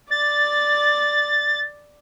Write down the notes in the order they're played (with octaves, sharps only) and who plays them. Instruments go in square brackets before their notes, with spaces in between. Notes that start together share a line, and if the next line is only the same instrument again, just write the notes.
[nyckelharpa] D5 [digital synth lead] A6